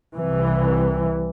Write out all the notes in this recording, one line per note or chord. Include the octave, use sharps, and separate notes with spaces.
C2 E3